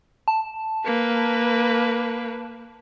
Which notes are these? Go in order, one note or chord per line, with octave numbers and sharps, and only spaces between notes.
A5
A#3 B4